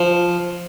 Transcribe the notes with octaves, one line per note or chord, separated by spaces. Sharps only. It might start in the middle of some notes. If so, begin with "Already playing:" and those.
Already playing: F3